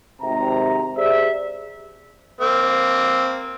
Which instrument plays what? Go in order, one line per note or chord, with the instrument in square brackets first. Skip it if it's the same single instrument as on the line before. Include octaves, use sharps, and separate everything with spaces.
[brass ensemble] G#1 C3 A#5
G4 G#4 C5 D5 E5
[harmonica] A#3 C4